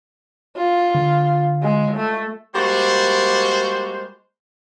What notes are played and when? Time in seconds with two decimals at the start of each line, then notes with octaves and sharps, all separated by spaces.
0.57 F4
0.95 D3
1.63 G#3
1.96 A3
2.55 G3 G#3 A#3 F#4 C5